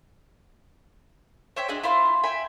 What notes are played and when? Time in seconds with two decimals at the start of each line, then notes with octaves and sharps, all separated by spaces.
1.56 C5 C#5 E5 G5
1.68 D4 F#4 G#4 D#5
1.83 E4 F4 C5
2.24 E5 G5 G#5 B5